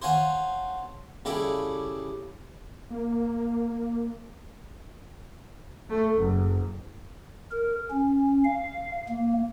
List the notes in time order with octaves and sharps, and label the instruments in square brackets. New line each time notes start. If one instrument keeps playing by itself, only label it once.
[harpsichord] C5 C#5 F5 F#5 G#5 A5
C#3 G3 E4 G#4 A4 D5
[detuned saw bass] A#3
[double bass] A3
F#1
[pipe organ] A#4
C#4
F5
A#3